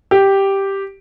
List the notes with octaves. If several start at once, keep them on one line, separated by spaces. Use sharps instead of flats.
G4